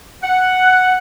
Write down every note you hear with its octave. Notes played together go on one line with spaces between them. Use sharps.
F#5